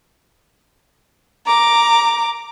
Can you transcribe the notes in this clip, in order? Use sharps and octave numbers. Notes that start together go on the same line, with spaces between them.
A#5 D6